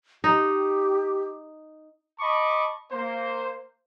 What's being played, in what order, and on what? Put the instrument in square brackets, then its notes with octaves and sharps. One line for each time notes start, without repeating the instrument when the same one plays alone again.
[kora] D#4 [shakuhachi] G4
[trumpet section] D#5 A5 B5 C#6 D6
A#3 C5